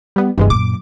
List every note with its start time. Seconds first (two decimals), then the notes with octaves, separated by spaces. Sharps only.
0.16 G3 B3
0.38 G1 C2 G2 E3 G#3
0.50 F#2 A#2 D6